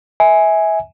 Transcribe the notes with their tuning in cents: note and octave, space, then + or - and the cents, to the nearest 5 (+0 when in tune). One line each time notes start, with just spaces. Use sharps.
E5 -25 G#5 +0